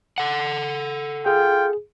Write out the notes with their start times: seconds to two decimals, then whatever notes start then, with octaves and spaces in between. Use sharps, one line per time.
0.18 A4 F#5
1.26 F4 G#4 G5